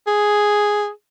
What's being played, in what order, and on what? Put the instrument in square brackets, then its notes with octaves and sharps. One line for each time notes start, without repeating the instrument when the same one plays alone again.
[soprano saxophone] G#4